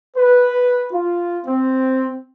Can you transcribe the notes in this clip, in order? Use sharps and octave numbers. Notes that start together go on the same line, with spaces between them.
B4
F4
C4